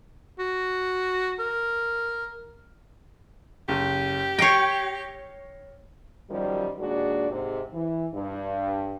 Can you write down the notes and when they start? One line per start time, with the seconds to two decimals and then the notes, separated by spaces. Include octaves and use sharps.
0.39 F#4
1.39 A#4
3.69 F#1 G4
4.39 C#5 G5 A#6 C7 C#7
6.30 F#2 D#3 F3 G3
6.79 D#2 A#2 G#3 D4 F#4 D5
7.30 G#2 C3
7.73 E3
8.14 G2